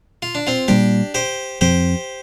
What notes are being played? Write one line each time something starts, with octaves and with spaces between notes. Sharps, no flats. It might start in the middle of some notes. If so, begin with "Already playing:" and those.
F4
D4
C4 F4
A#2 G3 A#3 D4 G4
G4 C5
F2 F3 C4 G4 C5